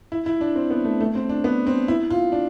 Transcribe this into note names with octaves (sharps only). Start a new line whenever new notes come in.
E4
E4
D4
C4
B3
A3
A3
C4
D4
B3
C4
E4
F4
D4